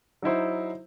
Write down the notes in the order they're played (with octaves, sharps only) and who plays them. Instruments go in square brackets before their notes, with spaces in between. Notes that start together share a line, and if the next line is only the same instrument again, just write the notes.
[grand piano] F#3 D#4 E4 C5